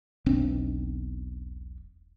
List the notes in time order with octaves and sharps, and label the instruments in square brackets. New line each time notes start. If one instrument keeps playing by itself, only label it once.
[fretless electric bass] E1 B1 C4 D4